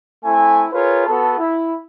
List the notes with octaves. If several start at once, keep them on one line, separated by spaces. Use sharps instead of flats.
A3 C4 E4 G#5
F4 G#4 A#4 B4 C#5
B3 F#4 A4
E4